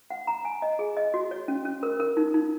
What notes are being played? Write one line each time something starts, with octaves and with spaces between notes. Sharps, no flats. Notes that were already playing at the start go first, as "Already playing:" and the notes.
F#5
A#5
G#5
D#5
G#4
D#5
F#4
C#5
C#4
C#4
A#4
A#4
D#4
D#4